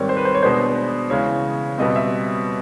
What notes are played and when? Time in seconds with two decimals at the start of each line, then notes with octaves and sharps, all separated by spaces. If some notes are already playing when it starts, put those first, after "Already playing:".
Already playing: G#2 D#3 G3 C4 C#5 D5
0.09 C5
0.17 B4
0.25 C5
0.35 C#5
0.43 B2 G#3 B3 D4 C5
1.10 C#3 E3 G#3 C#5
1.78 B2 G3 C4 D#5
1.96 E5